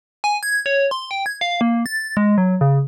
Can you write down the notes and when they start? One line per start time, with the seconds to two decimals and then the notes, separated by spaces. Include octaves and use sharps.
0.24 G#5
0.43 G#6
0.66 C#5
0.91 C6
1.11 G5
1.26 G#6
1.41 F5
1.61 A#3
1.86 A6
2.17 G#3
2.38 F#3
2.61 C#3